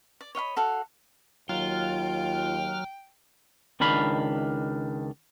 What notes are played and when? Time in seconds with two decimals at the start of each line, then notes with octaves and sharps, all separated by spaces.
0.21 D5
0.35 C#5 D#5 F5 B5
0.56 F#4 A4 F5 F#5
1.49 D#2 F#3 F4 G5 F6
3.80 C#2 D#3 D4 F5 B5